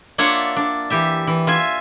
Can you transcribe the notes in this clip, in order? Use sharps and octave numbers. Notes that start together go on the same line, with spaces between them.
A#3 D4 F4 C#5 E5 F#5
D4
E3 G4 E5
E3
F4 E5 G#5